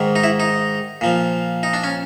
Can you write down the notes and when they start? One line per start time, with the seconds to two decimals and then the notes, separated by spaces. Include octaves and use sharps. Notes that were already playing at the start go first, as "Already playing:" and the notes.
Already playing: G#2 D#3
0.16 D#4
0.24 E4
0.40 D#4
1.01 A#2 F3
1.63 D#4
1.73 D4
1.84 C#4